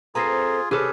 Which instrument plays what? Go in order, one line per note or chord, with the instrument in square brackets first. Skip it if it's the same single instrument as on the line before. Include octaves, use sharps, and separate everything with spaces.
[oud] C4 A4 B4 [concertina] F4 G#4 [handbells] A#5 A#6 C7
[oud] C3 [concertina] C#4 B4 [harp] G#4 A4 [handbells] D6